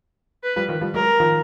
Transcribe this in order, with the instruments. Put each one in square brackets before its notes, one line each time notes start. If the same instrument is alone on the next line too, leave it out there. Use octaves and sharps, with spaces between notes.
[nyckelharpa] B4
[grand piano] F3 G3
D#3 F3
F3 G3
[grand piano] F#3 G#3 [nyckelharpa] A#4
[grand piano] D#3 F3